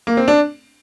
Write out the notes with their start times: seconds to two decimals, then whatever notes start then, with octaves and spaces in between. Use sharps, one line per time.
0.07 A#3
0.17 C4
0.28 D4